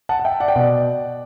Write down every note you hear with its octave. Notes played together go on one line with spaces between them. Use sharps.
F#5 A5
F#5
E5 G5
D5 F#5
G5
B2 D5 F#5